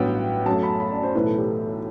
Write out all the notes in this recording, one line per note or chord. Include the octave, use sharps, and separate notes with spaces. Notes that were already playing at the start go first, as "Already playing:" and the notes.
Already playing: A1 G2 F#3 B3 G5
F#2 F#3 A3 A5
B5
B5
D5
C5
B1 A2 E3 A3 B4
A4
G4